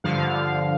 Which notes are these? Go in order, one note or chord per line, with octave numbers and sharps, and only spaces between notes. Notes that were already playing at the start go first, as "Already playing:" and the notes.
G2 D3 F3 F5